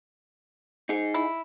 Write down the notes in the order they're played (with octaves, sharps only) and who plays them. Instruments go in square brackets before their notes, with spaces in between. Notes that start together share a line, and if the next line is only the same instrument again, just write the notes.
[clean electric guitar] D#4 G#4
[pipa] E4